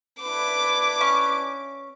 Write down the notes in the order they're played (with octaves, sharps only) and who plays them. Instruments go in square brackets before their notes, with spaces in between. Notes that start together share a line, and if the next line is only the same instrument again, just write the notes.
[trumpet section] D4 E4 B4 [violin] D6
[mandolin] C#4 C#6